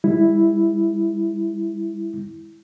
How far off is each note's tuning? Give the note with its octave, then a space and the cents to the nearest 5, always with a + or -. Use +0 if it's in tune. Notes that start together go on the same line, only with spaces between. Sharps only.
G3 +45 E4 +0